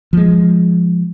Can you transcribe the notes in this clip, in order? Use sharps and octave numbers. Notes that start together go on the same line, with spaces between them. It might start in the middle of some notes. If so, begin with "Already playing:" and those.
F3 G#3